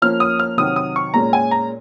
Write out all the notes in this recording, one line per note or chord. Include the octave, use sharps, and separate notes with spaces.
F3 A#3 C#4 F6
D#6
F6
C3 D#3 F#3 D#6
D#6
C#6
A#2 G#3 C#4 A#5
G#5
A#5